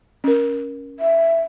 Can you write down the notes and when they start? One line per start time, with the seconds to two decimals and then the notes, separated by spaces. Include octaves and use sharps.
0.24 C#4 A#4
1.00 E5